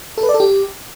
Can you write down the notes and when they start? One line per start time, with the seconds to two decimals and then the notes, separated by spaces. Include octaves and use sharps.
0.18 A4
0.23 B4
0.29 D5
0.34 A4
0.40 G4